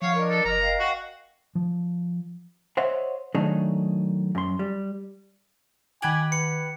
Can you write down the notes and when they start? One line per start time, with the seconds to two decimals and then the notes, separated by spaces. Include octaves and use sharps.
0.02 F3 C#5 F5 F#5 C#6 F6
0.14 D4 A#4 D#5 A#5
0.30 A4
0.45 F#1 D#5 A#5
0.61 D#5 F5 G5
0.80 F#4
1.55 F3
2.77 C5 C#5 D#5 E5 F#5
3.35 D#3 F#3 A3 D4 D#4 G#4
4.35 F#2 C6
4.59 G3
6.02 D#3 G4 F#5 G#5 B5 G#6 F#7
6.32 B4 C#7